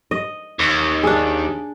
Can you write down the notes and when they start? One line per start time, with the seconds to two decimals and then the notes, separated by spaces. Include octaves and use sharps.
0.11 D#5
0.59 D#2
1.03 D4 G#4